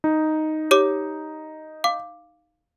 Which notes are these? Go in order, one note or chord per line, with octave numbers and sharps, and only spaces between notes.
D#4
G4 C#5 D6
F5 D6